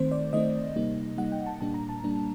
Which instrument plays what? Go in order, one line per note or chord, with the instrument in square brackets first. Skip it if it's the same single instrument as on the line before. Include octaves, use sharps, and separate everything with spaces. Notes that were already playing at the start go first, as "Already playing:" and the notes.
Already playing: [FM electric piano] D#3 A3 C4 C5
D5
D#3 A3 C4 D#5
C3 G3 A#3 D#4
C3 G3 A#3 D#4 F#5
G5
A5
A#2 G3 A#3 D4 A5
A#5
A5
A#2 G3 A#3 D4